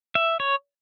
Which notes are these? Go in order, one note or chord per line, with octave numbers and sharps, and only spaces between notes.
E5
C#5